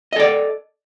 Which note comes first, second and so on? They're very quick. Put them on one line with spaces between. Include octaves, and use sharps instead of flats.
D#5 A4 D5